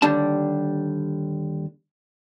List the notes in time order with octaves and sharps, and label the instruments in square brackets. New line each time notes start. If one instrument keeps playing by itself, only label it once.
[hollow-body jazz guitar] D#2 D3 G3 D4 A5